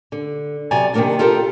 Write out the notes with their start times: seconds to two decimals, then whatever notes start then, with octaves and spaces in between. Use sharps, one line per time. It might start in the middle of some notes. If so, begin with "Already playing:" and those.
0.12 D3
0.71 C3 F#3 B3 D5 G#5 A#5
0.94 C3 D#3 F3 A#3 B3 D4
1.19 F4 G4 A4 A#4 F5 G5